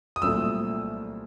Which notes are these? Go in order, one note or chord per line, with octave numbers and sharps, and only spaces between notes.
D#6
C2 A#2 F#3 A3 C4 E6